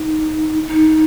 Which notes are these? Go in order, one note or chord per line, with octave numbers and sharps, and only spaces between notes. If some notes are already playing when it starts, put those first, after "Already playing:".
Already playing: D#4
D#4